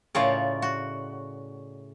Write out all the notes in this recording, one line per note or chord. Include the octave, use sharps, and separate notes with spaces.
A2 C#3 F4 A#4 C#5 D5
F#4